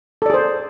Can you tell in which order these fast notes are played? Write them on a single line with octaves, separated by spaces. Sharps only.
A4 D5 G#4 C5